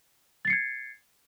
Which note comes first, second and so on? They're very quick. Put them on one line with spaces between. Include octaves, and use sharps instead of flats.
A6 C7 C#7 G#6